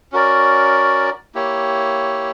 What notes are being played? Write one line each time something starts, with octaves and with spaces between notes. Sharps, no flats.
C#4 F#4 A#4 D5
A#3 E4 G4 C#5